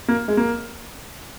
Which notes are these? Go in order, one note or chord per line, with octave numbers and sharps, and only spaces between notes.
A#3
G#3
A#3